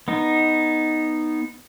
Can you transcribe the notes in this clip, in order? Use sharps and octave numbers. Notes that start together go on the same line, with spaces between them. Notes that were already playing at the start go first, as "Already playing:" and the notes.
B3 D#4